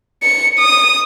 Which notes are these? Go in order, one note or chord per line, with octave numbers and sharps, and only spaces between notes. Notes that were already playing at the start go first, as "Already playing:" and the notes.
C#7
D#6